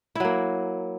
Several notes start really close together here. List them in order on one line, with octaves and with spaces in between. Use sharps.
E4 F#3 A#3